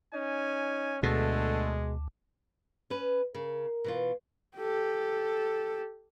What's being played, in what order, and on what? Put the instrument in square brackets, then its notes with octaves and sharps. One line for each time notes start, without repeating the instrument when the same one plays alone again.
[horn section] C#4 D#4 G#5
[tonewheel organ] D2 [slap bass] B2 [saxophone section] D3 A3 [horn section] G#3
[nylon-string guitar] C#4 B4
[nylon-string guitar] C#3 [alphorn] A#4
[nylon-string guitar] B2 E3 F4
[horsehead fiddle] G4 A4